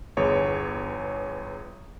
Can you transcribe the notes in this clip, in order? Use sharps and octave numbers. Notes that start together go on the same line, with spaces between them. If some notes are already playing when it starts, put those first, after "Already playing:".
G1 E2 G#4 C#5